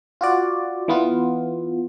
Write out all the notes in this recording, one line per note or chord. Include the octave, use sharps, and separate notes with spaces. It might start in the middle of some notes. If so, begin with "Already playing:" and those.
F4 F#4 D5
E3 B3 F4